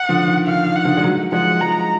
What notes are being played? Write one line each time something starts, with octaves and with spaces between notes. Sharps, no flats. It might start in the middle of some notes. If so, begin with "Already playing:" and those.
Already playing: F#5
D3 F3
D#3
D#3 F5
D#3
F#5
D3 F3
G#3
D#3 F#3
F3 G#3 F#5
F3 G#3 A#5